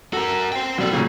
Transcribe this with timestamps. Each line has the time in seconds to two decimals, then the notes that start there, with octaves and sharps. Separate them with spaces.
0.13 F#4 A4 A#4
0.52 C5 G5
0.78 B2 F#3 A4 D5
0.92 A#2 C#3